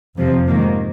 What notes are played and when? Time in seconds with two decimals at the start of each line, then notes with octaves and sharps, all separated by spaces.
0.16 F2 C3 F3
0.48 G#2 D#3 A#3